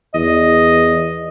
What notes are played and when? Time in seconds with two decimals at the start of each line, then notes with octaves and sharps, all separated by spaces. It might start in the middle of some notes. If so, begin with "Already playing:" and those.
0.14 E2 D#5